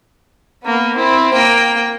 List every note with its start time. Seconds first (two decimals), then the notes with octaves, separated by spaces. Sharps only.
0.64 A#3 B3
0.95 C4 E4
1.33 A#3 G5